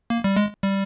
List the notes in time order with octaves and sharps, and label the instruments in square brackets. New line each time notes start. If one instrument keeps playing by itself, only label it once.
[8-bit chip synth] A#3
G3
G#3
G3